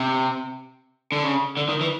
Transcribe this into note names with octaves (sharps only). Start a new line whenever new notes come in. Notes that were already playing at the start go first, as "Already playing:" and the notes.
Already playing: C3
D3
C#3
D3
D#3
E3